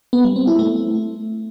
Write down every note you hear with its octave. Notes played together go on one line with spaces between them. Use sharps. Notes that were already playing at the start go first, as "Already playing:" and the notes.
B3
G3
C4
E4
A3